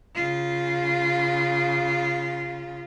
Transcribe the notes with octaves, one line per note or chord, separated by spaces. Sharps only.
C#3 F4